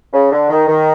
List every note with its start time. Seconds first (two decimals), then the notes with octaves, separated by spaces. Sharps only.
0.13 C#3
0.32 D3
0.50 D#3
0.68 D#3